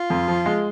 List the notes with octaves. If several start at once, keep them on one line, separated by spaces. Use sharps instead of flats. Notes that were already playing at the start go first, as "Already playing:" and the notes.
Already playing: F4
F2
F3
G#3